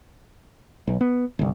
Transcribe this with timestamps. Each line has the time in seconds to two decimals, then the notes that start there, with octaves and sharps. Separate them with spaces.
0.87 B1
1.01 B3
1.39 G1 C2